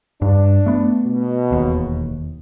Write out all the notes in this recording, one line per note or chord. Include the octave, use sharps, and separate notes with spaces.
G2 D4
A3 B3
B2
E1 D#2